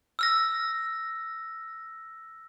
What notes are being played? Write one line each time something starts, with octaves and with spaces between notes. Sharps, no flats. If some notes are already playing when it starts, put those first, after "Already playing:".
E6 F6 A#6